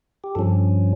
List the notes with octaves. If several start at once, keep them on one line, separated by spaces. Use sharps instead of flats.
G4
G2 F3 C#4 A4